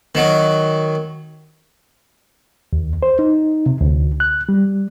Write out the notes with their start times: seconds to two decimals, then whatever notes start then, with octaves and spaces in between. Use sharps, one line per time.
0.15 D#3 F#3
2.73 D#2
3.03 C5
3.19 D#4
3.66 C3
3.81 D2
4.20 F#6
4.49 G3